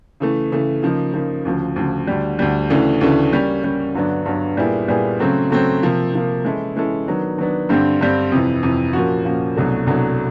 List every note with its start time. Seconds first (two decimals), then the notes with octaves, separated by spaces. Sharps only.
0.20 C#3 E3 A3
0.52 C#3 E3 A3
0.83 C#3 F3 A#3 D#4
1.14 C#3 F3 A#3 D#4
1.45 D2 C#3 F3
1.76 D2 C#3 F3
2.07 D2 D3 G3
2.39 D2 D3 G3
2.70 D2 C#3 E3 A3 D4
3.01 D2 C#3 E3 A3 D4
3.32 G3 A#3 C#4
3.63 G3 A#3 C#4
3.95 G2 D3 F#3 B3 D4
4.26 G2 D3 F#3 B3 D4
4.57 A#2 G3 B3 E4 G#4
4.88 A#2 G3 B3 E4 G#4
5.19 C#3 F#3 A3 C4
5.50 C#3 F#3 A3 C4
5.82 C3 F3 A#3
6.12 C3 F3 A#3
6.45 E3 G#3 C#4 E4 A4
6.75 E3 G#3 C#4 E4 A4
7.07 D#3 F#3 B3 D4
7.38 D#3 F#3 B3 D4
7.69 G2 D3 G3 C4
8.01 G2 D3 G3 C4
8.32 F2 C3 E3
8.63 F2 C3 E3
8.93 A#2 F3 A#3 C#4 F#4
9.25 A#2 F3 A#3 C#4 F#4
9.56 C2 B2 F#3 A3 D4
9.87 C2 B2 F#3 A3 D4